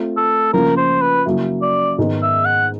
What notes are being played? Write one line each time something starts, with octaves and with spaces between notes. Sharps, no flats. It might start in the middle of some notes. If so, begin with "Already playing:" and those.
Already playing: A3 C4 F4
A4
C#3 F3 A#3 C#4 F4 A#4
C5
B4
C#3 F#3 A#3 C#4 E4
D5
G#2 D#3 G#3 B3 D#4
E5
F#5